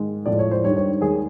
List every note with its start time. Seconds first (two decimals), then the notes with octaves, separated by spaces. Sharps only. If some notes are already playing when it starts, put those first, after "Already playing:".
Already playing: G#2 D#3 G#3
0.26 A2 F3 G#3 D5
0.39 C#5
0.51 C5
0.64 G2 D#3 G3 C#5
0.77 C#5
1.01 D#2 D#3 G#3 G#4